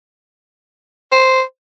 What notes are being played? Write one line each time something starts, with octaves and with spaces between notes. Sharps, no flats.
C5